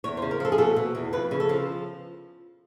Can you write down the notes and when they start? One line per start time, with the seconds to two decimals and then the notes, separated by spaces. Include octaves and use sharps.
0.04 E2 C#5
0.17 C5
0.22 C#3
0.31 A#4
0.40 F3 A4
0.52 G#4
0.58 B2 A4
0.76 B2
0.95 E2
1.13 F2 B4
1.31 C#3
1.40 A4
1.49 F3